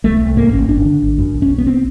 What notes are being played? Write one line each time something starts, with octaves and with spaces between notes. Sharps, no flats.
C2 A3
C2
G#2 A#3
G#1 C#4
G1 D4
D3
G#1
F#2
B1
C#4
B1
B3
C4